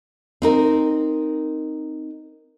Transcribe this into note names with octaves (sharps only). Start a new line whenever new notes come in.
C4 D#4 A#4